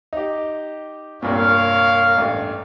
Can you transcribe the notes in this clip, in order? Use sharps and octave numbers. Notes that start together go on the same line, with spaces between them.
D#4 G4
C2 G2 A#2 A#4 C#5 F5
A1 G2